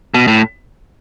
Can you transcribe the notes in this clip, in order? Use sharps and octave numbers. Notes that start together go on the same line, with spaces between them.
B2
A2